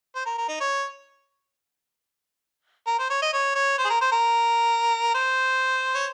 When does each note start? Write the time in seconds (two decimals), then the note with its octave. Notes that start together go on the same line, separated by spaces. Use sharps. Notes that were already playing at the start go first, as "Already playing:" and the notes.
0.15 C5
0.26 A#4
0.38 A#4
0.49 D#4
0.61 C#5
2.87 A#4
2.99 C5
3.10 C#5
3.22 D#5
3.34 C#5
3.55 C#5
3.78 C5
3.85 G#4
3.90 A#4
4.01 C5
4.12 A#4
5.15 C5
5.94 C#5